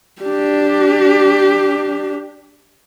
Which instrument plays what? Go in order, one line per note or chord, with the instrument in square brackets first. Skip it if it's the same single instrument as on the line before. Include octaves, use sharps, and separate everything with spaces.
[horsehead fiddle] D4 G4